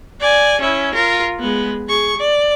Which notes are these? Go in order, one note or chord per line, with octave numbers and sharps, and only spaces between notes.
D5 G#5
C#4 E4
F4 A#4
G#3 B3
G#4 C#6
D5